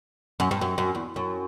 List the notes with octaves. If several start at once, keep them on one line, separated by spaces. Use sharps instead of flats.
F#2
G2
F#2
F#2
E2
F#2